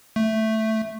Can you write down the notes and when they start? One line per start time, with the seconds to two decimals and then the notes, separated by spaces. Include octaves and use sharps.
0.16 A3